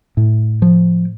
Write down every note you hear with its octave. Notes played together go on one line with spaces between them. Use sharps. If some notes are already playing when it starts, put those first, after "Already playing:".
A2
F3